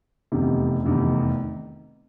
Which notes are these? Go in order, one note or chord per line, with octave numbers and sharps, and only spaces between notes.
F1 E2 C3 D#3
F1 E2 C3 D#3